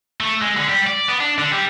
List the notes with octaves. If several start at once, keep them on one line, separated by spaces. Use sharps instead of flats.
A3
G#3
D3
G3
D5
B3
D4
D3
G3